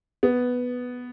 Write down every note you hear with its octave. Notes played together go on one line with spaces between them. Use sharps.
B3